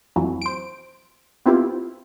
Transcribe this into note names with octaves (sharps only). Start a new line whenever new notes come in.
F2 A2 E3 F#3
C5 D7
B3 C4 E4 F4 G4